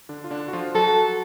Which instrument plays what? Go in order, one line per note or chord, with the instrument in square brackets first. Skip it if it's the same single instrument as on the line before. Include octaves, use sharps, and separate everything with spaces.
[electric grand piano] D3 D4
F4
D3 D4
F#4
F3 F4
[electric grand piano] F#3 F#4 [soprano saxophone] A4